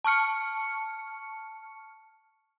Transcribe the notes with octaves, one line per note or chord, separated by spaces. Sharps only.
A5 C#6 F6 C#7